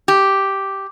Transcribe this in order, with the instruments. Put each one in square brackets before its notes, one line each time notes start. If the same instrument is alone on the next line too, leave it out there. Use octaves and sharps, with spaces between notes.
[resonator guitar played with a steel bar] G4